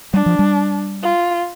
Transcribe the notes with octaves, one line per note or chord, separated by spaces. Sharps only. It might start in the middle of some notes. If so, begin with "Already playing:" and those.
G3 D4
F3
G3
F4